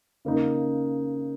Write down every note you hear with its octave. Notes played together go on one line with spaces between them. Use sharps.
C#3 A#3 D#4 A#4